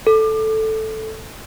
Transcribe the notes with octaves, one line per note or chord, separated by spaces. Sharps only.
A4